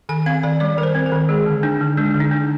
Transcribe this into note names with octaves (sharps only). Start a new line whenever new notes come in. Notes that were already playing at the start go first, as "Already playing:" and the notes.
D#3 G#5
C4 F5
D#3 D5
G3 D5
D#3 A#4
C5
C4
A#4
D#3
G#3 G#4
D3
D4 D#4
D3
G#3 D4
D3
D#4
D4